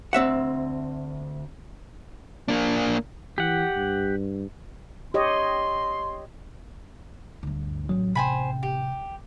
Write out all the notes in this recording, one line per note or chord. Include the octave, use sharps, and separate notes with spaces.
D2 C4 E5 F#5
A#3 D4
E3 G4 F#5
G2
G4 C#5 D#5 C6
D2 G2
A1 F#3 C#4
C3 C5 G5 G#5 B5
G4